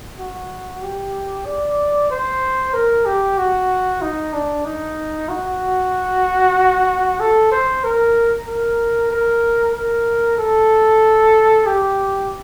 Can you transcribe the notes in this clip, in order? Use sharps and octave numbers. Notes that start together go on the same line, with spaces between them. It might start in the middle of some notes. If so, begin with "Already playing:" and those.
F#4
G4
D5
C5
A#4
G4
F#4
D#4
D4
D#4
F#4
A4
C5
A#4
A#4
A#4
A#4
A4
G4